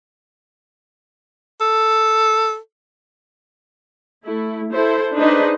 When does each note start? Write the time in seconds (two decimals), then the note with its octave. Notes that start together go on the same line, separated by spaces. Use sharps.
1.61 A4
4.24 A3 E4
4.72 E4 A4 C5
5.15 D4 D#4 G#4 B4 C5 D#5